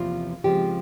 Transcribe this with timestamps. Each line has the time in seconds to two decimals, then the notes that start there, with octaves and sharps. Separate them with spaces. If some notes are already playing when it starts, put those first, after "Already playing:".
Already playing: E2 C3 F3 A#3 F4
0.44 C#3 F3 G#3 C4 G4